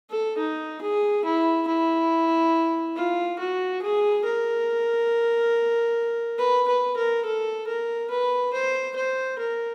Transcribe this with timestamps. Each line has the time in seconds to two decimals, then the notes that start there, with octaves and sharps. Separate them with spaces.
0.10 A4
0.38 D#4
0.82 G#4
1.25 E4
1.68 E4
2.96 F4
3.39 F#4
3.82 G#4
4.24 A#4
6.38 B4
6.68 B4
6.97 A#4
7.25 A4
7.67 A#4
8.11 B4
8.53 C5
8.96 C5
9.39 A#4